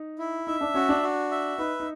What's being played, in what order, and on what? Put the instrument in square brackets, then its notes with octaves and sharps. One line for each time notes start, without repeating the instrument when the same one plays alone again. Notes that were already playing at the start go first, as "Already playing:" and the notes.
Already playing: [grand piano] D#4
[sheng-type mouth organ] E4
[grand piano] D#4 [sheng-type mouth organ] E5
[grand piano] D4
[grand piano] C#4 [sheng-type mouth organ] F#4
[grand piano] D4
[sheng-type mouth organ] F#4
E5
[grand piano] D#4 [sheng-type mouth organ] B4
[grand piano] D#4